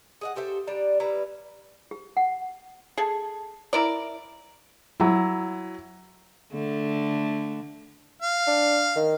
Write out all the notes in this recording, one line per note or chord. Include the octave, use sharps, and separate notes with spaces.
G#4 D#5 F#5
G4 A4 C5 E5
G3 D4 D5 A#5
G3 E4 B4 A#5
G4
F#5
G#4 A4
E4 A#4 D5
F#3 E4
D3 A3
F5
D4
D#3